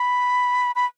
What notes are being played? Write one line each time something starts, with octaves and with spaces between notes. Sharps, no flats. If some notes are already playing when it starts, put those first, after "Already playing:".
Already playing: B5
B5